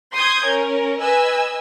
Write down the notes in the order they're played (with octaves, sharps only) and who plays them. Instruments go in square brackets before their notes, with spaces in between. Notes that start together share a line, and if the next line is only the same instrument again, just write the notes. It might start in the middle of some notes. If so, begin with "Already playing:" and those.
[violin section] C6 D#6 G6 G#6
C#4 A#4
B4 D#5 G#5 E6